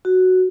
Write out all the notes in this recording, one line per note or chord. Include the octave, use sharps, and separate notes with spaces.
F#4